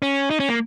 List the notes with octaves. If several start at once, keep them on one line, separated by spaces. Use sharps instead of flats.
C#4
D#4
C#4
A#3